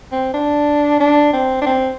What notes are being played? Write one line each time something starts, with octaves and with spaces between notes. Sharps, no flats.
C4
D4
D4
C4
D4
C4